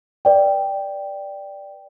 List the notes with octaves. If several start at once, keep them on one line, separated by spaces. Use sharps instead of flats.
B4 D5 G5